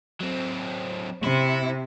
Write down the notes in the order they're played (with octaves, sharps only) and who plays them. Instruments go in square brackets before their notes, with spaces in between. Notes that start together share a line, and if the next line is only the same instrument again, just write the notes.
[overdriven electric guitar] F#3 C4
[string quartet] C3 [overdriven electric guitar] E4